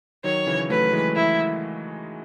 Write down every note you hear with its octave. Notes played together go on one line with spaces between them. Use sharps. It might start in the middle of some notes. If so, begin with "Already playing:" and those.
D#3 F#3 C#5
C#3 E3
F#3 A3 B4
E3 G#3
E4